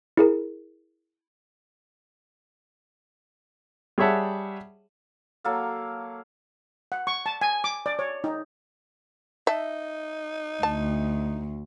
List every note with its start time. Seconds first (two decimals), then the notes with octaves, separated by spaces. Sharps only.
0.17 E4 G#4 A#4
3.98 G3 G#4 C#5 E5 F#5 A5
5.44 F#3 A#3 A4 F5
6.92 F#5
7.07 C#6
7.26 A5
7.41 G#5
7.64 D6
7.86 D5
7.99 C#5
8.24 D#4
9.47 D#4 E5 A5
10.63 D2 A5